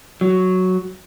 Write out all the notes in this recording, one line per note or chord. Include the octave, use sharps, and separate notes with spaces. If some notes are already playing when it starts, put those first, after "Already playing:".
F#3